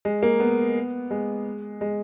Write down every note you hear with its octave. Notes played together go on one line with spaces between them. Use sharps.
G#3
A#3
B3
G#3
G#3